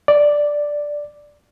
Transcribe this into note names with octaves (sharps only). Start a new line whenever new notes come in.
D5